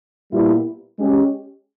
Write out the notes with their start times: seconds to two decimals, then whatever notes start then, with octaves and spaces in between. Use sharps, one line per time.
0.30 A#2 G3 B3 E4 G4
0.99 G#3 C#4 G4